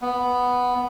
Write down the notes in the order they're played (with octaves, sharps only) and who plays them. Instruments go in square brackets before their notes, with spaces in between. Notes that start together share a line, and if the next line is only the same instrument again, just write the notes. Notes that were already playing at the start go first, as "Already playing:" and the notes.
[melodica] B3